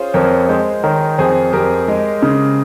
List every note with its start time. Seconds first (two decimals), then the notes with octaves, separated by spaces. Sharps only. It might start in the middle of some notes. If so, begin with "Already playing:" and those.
Already playing: C#4 F4 G#4 C5
0.14 F2 A#4 C#5
0.49 G#3 G#4 C5
0.83 D#3 A#4 C#5
1.18 F2 G#4 C5
1.53 F2 G4 A#4
1.88 G#3
2.22 C#3